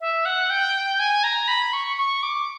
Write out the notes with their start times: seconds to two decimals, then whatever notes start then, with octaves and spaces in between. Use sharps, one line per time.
0.01 E5
0.25 F#5
0.50 G5
0.99 G#5
1.24 A#5
1.48 B5
1.73 C#6
1.97 C#6
2.23 D6